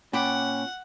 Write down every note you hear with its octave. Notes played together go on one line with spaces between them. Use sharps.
A#2 C#4 F#5 G5 B5 D6